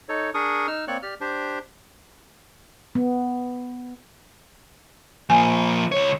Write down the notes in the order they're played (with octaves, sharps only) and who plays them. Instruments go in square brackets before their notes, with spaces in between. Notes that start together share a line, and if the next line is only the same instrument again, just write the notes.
[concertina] D#4 A4 C#5
D4 G#4 A#4 C#6 D#6
D#4 E6 F6
A#3 C4 C#5 D5 C#6 F#6
G4 D5 F6
D4 G4 C5
[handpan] B3
[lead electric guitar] F3 A#3 [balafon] G#5
[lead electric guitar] C#2 C#5